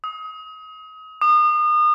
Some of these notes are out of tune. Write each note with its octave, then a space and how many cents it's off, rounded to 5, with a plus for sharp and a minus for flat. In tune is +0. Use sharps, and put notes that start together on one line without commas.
D#6 +30
D#6 -35